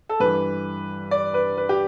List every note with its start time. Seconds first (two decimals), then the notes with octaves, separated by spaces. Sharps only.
0.09 A4
0.20 G2 E3 B4
1.11 D5
1.34 B4
1.57 B4
1.69 G4